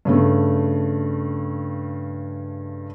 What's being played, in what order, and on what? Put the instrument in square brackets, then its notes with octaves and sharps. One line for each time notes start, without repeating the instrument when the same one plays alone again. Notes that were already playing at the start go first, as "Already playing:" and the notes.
[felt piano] G2 C#3 A3